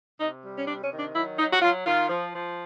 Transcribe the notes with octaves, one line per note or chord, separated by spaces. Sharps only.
C3 D#4
G3
C#4
C3 D4
C#4
D#3
D4
F#3 E4
F#3 D#4
F#4
F#3 F4
D#3 F4
F3
F3